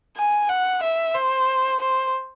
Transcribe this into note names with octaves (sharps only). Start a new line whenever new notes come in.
G#5
F#5
E5
C5
C5